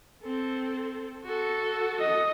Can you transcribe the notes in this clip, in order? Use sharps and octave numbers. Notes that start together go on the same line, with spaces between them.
C4 A4
F#4 A4
D#5